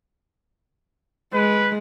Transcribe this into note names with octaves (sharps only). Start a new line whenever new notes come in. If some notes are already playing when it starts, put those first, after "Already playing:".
G#3 B4